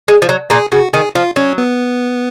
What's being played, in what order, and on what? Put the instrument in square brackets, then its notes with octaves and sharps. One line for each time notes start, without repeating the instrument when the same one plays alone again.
[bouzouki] G#3
F3
F#3
[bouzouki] A#2 A#3 [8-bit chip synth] G#4
[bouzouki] C#3 [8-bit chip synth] F#4
[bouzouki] D#3 [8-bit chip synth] G#4
[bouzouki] F3 [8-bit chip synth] F4
[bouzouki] F#3 [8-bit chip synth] C#4
[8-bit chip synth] B3